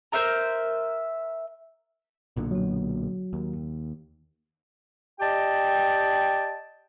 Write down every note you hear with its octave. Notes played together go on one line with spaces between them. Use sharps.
A#4 C5 E5 A#5
B1 A#2 D3
F#3 F#4
D#2
G4 D5 D#5 G5 A5